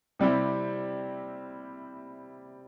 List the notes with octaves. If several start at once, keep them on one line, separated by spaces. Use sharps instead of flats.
C3 G3 C4 E4 G4